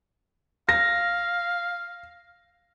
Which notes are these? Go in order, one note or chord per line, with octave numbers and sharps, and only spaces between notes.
F5 A#6